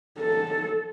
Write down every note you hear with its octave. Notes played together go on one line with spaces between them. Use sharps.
A4